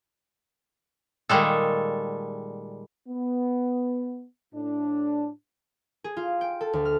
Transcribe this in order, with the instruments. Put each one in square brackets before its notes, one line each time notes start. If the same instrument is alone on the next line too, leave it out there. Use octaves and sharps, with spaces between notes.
[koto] A#2 D#3 G3 G#3 A4
[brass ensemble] B3
A2 D4
[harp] G#4
F4
G5
A4
D2
F6